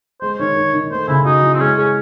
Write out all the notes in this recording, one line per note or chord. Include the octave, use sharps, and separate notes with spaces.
G#3 C5
D#3 C#5
D#3
D#3
A3 C5
C#3 E4
D#4 F#4
E3
C4
G#3 C#4
C#4 G#4